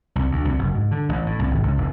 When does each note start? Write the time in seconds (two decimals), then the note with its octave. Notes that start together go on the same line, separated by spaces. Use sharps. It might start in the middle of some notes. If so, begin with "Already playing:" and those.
0.16 C2
0.31 D2
0.45 C2
0.59 F#1
0.75 G#2
0.91 D3
1.09 A1
1.26 A2
1.39 C2
1.51 G#1
1.63 C#2
1.78 F1